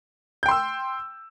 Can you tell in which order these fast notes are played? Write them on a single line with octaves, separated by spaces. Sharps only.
G6 G5 C6 E6